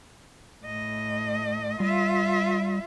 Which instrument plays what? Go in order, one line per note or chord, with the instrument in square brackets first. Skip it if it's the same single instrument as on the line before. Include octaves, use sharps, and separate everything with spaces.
[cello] A2 D#5
[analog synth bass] G3 [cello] F4 E5